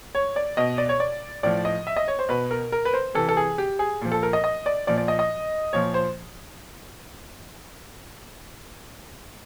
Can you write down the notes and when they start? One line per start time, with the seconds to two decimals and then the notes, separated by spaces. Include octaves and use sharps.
0.15 C#5
0.36 D5
0.57 B2 D#5
0.78 D5
0.89 C#5
1.00 D5
1.43 A2 F3 D5
1.65 D#5
1.87 E5
1.96 D#5
2.08 C#5
2.19 C5
2.29 B2 B4
2.51 A#4
2.72 A#4
2.85 B4
2.94 C5
3.15 C3 E3 A4
3.29 A4
3.37 G#4
3.58 G4
3.79 G#4
4.01 A#2 F3
4.12 A4
4.23 A#4
4.33 D#5
4.44 D#5
4.66 D5
4.87 A#2 F3 D5
4.97 D5
5.08 D#5
5.19 D#5
5.73 A#2 F3 C#5
5.94 C5